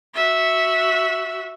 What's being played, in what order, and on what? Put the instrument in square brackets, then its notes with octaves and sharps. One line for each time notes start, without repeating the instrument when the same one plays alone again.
[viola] F#4 E5